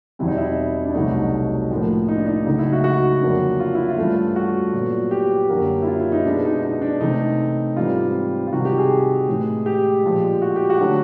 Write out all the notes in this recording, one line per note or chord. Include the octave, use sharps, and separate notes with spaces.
E2 B2 G3 C4 E4
D#4
E4
D4
C2 B2 F#3 A3 D#4
A2 F3 A#3
D#4
D4
D#4
C#2 C#3 F#3 A3 D#4
E4
F#4
F#4
F2 D3 F#3 A#3 D4
F4
E4
F4
G2 E3 A3 C#4
F#4
A#2 F#3 B3
G4
F#2 D3 F#3 A#3
E4
F4
E4
D#4
B2 G#3 B3 D4
D#4
D#4
D4
C3 E3 A3 C4 D#4
G#2 E3 G3 C4 F4
F4
C3 D#3 G3 F#4
G4
G#4
A2 E3 G#3
G4
A#2 F3 G#3
F#4
G4
F#4
D3 F#3 A3